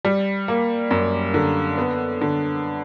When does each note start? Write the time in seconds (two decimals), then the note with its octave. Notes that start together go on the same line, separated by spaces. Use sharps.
0.05 G3
0.48 A#3
0.91 F#2
1.34 D3
1.78 B3
2.21 D3